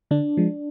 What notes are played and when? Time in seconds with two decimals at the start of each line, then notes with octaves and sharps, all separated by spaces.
0.11 D3 D4
0.37 F3 G#3